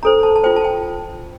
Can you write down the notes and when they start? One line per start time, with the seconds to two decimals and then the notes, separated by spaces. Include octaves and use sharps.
0.03 D4 A4 C5 A#5
0.23 A5
0.36 A5
0.43 F4 C5 G5
0.56 A5
0.64 G5